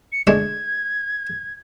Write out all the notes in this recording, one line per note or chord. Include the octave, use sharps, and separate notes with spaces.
C#7
G#3 A3 D4 G#6